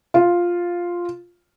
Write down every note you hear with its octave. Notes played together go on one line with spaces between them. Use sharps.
F4